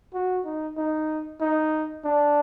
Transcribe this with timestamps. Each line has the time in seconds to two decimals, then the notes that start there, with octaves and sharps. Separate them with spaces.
0.14 F#4
0.45 D#4
0.77 D#4
1.41 D#4
2.05 D4